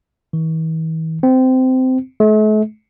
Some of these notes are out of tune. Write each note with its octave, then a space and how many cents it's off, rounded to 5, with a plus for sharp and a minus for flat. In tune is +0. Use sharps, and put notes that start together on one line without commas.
E3 -45
C4 -20
A3 -45